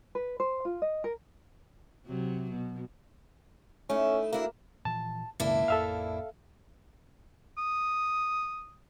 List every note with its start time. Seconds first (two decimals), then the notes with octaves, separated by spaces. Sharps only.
0.15 B4
0.40 C5
0.65 F4
0.82 D#5
1.04 A#4
2.06 C3 F#3
2.50 B2
3.90 A3 C#4 D#4 E4
4.33 A#3 D4 E4 F#4
4.85 A#2 E3 F3 A5
5.40 C#2 F#2 B2 D#3 A#3 D4 E4
5.68 A1 F2 A4 E5 F5
7.58 D#6